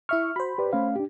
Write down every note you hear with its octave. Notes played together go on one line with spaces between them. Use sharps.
E4 E5 C#6 F6
F#4 C5 B5
G4 B4 D5
A3 C#4 F5
D4 G4